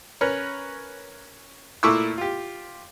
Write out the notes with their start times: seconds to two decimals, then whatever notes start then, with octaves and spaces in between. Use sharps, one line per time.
0.21 C#4 A#4 B4 C#5
1.83 A#2 A3 E4 C#6 D6 E6
2.18 F4 G4